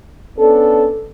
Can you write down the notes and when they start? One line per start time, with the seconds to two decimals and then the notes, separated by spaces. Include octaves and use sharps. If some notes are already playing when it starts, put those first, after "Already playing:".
0.38 B3 C#4 D4 A4